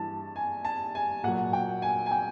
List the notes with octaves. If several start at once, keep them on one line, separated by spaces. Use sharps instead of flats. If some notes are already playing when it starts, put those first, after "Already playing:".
Already playing: G2 E3 A5
G#5
A5
G#5
A#2 F#3 F#5
G5
G#5
G#5
G5